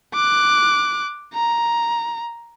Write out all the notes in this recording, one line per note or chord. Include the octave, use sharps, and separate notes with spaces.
D6 F#6
A#5